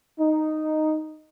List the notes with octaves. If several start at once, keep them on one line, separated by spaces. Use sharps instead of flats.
D#4